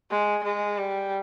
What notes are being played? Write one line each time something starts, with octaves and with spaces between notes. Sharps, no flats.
G#3
G#3
G3